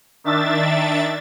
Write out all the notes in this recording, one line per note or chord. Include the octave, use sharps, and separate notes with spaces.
D#3 D4 E5 A6